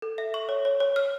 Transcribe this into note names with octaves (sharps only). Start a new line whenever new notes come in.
A4
E5
C#6
C#5
C#5
C#5
F6